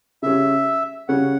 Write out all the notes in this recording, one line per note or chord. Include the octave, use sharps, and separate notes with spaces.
C#3 G3 C#4 E5
C#3 G3 C#4 F#5